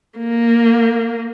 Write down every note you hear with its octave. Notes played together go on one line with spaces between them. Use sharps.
A#3